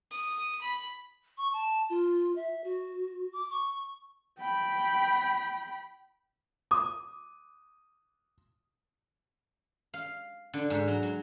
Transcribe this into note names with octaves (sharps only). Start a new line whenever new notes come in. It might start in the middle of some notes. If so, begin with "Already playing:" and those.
D#6
B5
C#6
A5
F4
E5
F#4
D6
C#6
G5 B5
D6 D#6
F5
D3
G#2
F#3
F#3